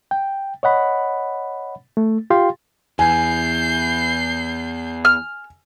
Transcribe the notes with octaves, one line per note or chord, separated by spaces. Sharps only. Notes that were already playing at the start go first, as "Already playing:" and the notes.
G5
C#5 D#5 F#5 B5
A3
F4 G4 F5 G5 C6
E2 G#5 G6 C7
F6